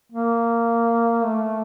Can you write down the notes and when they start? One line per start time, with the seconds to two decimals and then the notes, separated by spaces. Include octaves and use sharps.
0.12 A#3
1.25 A3